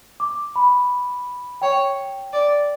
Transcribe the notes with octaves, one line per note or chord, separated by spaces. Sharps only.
D6
B5
C#5 G5
D5